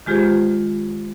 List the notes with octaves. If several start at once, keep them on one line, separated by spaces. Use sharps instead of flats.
D#3 G#3 F4 G4 G#4 C5